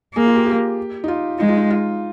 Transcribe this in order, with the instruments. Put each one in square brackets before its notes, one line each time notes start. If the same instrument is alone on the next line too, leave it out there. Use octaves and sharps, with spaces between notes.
[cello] A#3 [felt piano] G#4
[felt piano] F4
G4
G4
D#4
F4
[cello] G#3 [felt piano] D#4
[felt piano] F4
D#4
F4